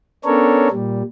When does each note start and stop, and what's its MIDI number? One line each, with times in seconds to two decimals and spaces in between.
0.25 0.68 59
0.25 0.68 61
0.25 0.68 62
0.25 0.68 69
0.25 0.68 70
0.25 0.68 73
0.71 1.03 46
0.71 1.03 55